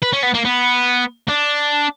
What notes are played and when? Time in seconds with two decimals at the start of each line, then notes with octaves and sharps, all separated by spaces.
0.02 B4
0.13 C#4
0.23 B3
0.34 A#3
0.45 B3
1.28 D4